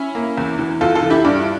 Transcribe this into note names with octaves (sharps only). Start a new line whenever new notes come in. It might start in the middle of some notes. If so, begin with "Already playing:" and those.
Already playing: C#4 E4
A#3
E2
E3
E2 F4 A4
F4 A4
E3
E4 G4
G2 D4